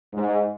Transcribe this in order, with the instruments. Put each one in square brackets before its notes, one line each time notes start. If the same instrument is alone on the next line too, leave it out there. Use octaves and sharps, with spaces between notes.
[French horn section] G#2